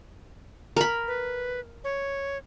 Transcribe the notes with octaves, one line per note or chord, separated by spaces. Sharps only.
A#4 B5
B4
C#5